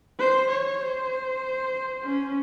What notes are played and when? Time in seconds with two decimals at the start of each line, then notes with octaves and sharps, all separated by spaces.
0.19 C5
0.50 C#5
0.81 C5
2.04 C#4